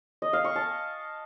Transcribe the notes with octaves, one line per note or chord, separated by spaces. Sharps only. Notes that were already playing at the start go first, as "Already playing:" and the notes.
D#5
F5
C#6
A5